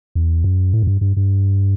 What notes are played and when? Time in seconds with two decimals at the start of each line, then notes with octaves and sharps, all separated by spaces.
0.15 E2
0.44 F#2
0.73 A2
0.82 F#2
0.87 G2
1.01 G2
1.17 G2